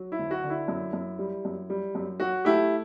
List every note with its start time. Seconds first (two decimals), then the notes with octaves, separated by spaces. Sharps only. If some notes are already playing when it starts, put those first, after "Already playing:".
Already playing: F#3
0.12 E4
0.19 D2
0.31 F#4
0.43 D3
0.50 E4
0.68 F#2
0.93 F#2
1.19 G3
1.45 F#2
1.70 G3
1.95 F#2
2.20 F#3 F#4
2.45 A3 E4 G4